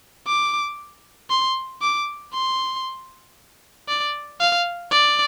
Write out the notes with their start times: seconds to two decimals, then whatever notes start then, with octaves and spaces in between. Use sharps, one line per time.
0.27 D6
1.30 C6
1.82 D6
2.33 C6
3.88 D5
4.40 F5
4.91 D5